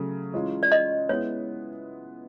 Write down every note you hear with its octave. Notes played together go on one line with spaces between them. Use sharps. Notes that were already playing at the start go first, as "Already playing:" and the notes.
Already playing: C#3 F#3 A3
E3 G#3 C#4 F4
D5
D#5
G#3 B3 E4 C#5